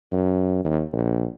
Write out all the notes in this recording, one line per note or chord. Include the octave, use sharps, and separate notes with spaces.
F#2
D#2
A#1